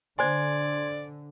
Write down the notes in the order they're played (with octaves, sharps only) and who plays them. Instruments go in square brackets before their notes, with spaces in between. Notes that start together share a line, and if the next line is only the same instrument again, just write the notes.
[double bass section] D3 [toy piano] C5 G#5 [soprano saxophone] D5 [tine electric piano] C6 G#6